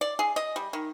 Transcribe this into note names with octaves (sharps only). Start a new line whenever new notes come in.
D5
G#4
D#5
G3
D#3